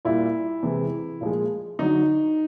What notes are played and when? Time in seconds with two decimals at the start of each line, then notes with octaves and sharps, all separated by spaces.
0.05 A#2 G3 E4
0.63 C3 E3 G#3
1.21 A#2 F3 G#3
1.79 D3 F#3 D#4